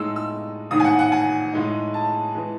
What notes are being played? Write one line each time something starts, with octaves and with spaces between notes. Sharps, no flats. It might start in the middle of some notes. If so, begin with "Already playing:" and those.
Already playing: A2 G#3 D#4 E6
E6
A1 G#2 D#3 D#6
G#5
F#5
F#5
G#5
A2 G#3 D#4
A5
E3 G#3